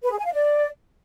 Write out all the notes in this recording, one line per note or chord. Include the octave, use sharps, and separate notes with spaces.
B4
G#4
G#5
F5
D5